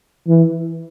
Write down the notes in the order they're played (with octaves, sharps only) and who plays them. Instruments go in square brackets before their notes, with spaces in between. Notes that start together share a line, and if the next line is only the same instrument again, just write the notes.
[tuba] E3